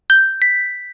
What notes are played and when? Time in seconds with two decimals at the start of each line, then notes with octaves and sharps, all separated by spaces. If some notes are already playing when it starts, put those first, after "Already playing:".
0.10 G6
0.42 B6